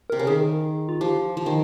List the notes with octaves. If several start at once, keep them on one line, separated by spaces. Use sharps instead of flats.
A#4
C3
C#3
D#3 G#4
F4
F3 G4
F3
D#3